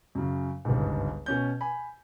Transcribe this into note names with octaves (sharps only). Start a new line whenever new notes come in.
F#2 C#3
G1 C#2 G#2
B2 C#4 G6
G#5 B5